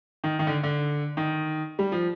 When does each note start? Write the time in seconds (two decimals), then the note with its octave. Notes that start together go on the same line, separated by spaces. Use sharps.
0.24 D#3
0.39 D#3
0.47 D3
0.63 D3
1.17 D#3
1.79 G3
1.92 F3